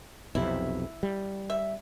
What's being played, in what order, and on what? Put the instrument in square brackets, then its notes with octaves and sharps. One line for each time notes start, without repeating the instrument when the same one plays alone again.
[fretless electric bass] B1 F2 C3 [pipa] E4
[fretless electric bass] G3
[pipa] E5